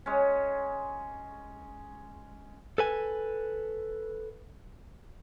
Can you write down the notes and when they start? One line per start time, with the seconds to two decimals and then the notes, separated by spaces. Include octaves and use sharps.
0.06 G#3 C#4
2.78 A4 B4 G#5